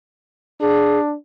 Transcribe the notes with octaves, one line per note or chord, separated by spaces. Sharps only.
D4 G#4